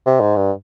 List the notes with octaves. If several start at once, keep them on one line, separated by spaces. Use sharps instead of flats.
C3
G#2
G2